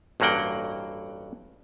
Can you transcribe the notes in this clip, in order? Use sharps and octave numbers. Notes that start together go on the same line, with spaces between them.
A1 G2 F#3 A#3 F#5 G5